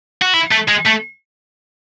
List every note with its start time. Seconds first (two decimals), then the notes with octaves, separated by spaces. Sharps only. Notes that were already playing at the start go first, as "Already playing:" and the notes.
0.22 F#4
0.34 E4
0.51 A3
0.68 G#3
0.85 A3